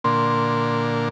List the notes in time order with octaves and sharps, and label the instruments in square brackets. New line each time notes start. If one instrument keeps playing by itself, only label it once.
[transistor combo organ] A#2 D3 A#3 [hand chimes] C6